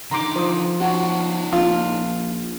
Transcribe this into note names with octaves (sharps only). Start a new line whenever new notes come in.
D3 D#4 A#5 C6 D6
F3 C5 D6 D#6
C#4 D#4 F#4 A5
A#1 F4